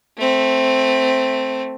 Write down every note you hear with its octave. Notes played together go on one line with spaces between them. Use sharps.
A3 C4